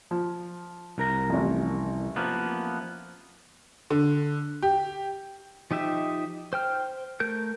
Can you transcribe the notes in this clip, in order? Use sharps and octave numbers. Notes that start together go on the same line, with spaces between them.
F3
C2 A#4 A#5
A1 F2
F3 A#3 B3
D3
G4
F3 D#4 G4 E5
C5 G5 F6
A3 A#4 G6